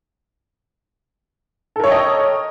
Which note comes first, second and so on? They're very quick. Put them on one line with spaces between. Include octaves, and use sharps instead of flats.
A4 A#4 C#5 G5 D#5